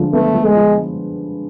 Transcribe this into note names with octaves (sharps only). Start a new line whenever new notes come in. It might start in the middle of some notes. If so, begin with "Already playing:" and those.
Already playing: D3 F3 G#3
A3 B3
F3
G#3
F3